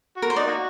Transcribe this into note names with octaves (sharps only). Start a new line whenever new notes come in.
F#4
A#4
C5
D#4 D5
A#3 D#4 F#4